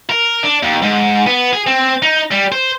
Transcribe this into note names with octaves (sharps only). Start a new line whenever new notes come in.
A#4
D4
D#2
G#2
B3
G#4
C4
D#4
G3
C5